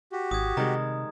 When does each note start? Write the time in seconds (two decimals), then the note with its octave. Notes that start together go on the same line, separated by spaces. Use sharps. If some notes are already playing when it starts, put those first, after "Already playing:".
0.12 F#4 G4
0.31 G#1 D#6 G#6
0.57 C3 D#3 G3 G#3 A#5